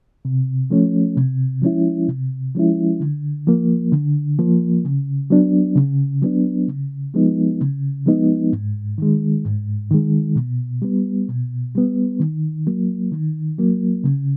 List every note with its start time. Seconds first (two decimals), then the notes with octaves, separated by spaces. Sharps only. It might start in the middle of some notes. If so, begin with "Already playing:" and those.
0.25 C3
0.70 F3 A3 C#4
1.16 C3
1.62 F3 G#3 C#4 E4
2.08 C3
2.55 F3 G#3 C#4 E4
3.00 D3
3.47 F3 A#3
3.92 D3
4.39 F3 A#3
4.85 C#3
5.30 F#3 B3 D4
5.76 C#3
6.22 F#3 B3 D4
6.68 C#3
7.14 F3 G#3 B3 D#4
7.61 C#3
8.06 F3 G#3 B3 D#4
8.53 G#2
8.98 D#3 G#3
9.45 G#2
9.91 D#3 G#3
10.36 B2
10.82 G3 B3
11.28 B2
11.75 G3 B3
12.20 D#3
12.67 F#3 A#3
13.12 D#3
13.58 F#3 A#3
14.04 C#3